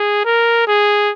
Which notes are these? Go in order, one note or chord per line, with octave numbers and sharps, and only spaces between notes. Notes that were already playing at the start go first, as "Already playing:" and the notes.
Already playing: G#4
A#4
G#4